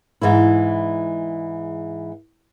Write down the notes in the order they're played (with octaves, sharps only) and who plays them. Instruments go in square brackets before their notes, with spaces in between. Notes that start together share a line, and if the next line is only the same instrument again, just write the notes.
[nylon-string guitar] G#2 E3 G#3 E4